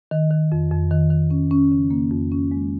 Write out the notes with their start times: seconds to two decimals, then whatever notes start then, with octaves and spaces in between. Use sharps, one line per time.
0.11 D#3
0.31 D#3
0.52 F2
0.71 F2
0.91 D#3
1.11 D#3
1.31 C#4
1.51 C#4
1.72 C#3
1.91 A#3
2.11 F2
2.32 C#4
2.51 G#3